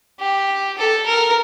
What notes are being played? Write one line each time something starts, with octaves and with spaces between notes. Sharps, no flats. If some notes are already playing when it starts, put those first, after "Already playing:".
G4
A4
A#4